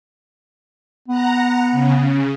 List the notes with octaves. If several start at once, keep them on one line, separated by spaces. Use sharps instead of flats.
B3 F#5 A#5
C#3